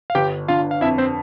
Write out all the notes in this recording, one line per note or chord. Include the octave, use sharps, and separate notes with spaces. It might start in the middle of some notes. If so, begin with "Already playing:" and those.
F5
G1 G4 G5
D3 F4 F5
F5
F2 E4 E5
C4 C5